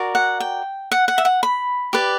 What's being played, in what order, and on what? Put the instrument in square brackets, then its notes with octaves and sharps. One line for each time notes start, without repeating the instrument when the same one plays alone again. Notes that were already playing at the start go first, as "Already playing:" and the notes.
Already playing: [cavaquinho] F#4 A#4 D5
F#5
G5
F#5
F#5
E5
F#5
B5
G4 B4 D5